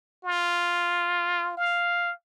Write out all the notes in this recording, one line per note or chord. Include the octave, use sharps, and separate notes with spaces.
F4
F5